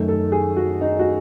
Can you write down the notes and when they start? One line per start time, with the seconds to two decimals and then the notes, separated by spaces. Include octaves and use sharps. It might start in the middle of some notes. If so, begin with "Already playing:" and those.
Already playing: F#2 D#3 A3
0.08 A4
0.32 G#4
0.56 F#4
0.81 D#4
0.99 F#4